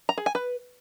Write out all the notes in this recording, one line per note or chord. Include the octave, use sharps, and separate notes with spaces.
A#5
G#4
G#5
B4